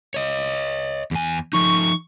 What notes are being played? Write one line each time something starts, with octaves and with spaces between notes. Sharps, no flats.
C#5 D#5
E2 G#5
F3 D#4 C#6